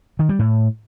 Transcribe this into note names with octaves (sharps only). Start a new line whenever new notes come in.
D#3
G3
A2